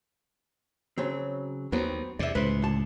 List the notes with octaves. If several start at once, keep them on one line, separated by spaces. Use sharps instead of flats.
C#3 F#3 C4
D#2 F#3 B3 C4
E2 C3 D5 E5
C#2 A2 B4 C5
D2 A5